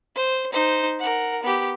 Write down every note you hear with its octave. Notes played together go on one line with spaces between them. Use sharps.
C5
D#4 C5
A#4 F#5
B3 G4